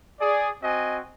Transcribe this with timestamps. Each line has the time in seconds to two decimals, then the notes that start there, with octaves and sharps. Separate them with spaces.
0.20 G#4 D5
0.63 C4 F#4 D#5 G#5